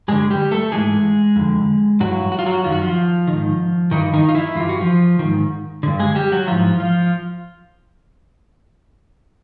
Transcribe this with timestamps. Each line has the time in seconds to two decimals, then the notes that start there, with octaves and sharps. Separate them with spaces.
0.08 G2 D3 G#3 G#4
0.30 G3 G4
0.51 A3 A4
0.72 G#2 E3 G#3 G#4
1.36 F2 D3
2.00 G2 E3 F#3 F#4
2.32 F#4
2.39 F4
2.46 F#3 F#4
2.64 F#2 D#3 F4
2.72 F#4
2.81 F3 F4
3.27 G#2 D#3
3.91 G2 D#3 E3 D#4
4.13 D#3 D#4
4.29 F4
4.35 E3 E4
4.55 G2 E3 F4
4.69 F#4
4.81 F3 F4
5.19 G#2 D#3
5.83 G2 D3
5.99 G#3 G#4
6.15 G3 G4
6.32 F#3 F#4
6.47 G#2 E3 F3 F4
6.79 F3 F4